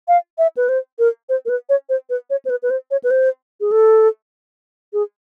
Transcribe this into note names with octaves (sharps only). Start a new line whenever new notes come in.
F5
E5
B4
C5
A#4
C5
A#4
B4
C#5
C5
B4
C#5
C5
B4
B4
C5
C#5
B4
C5
G#4
A4
G#4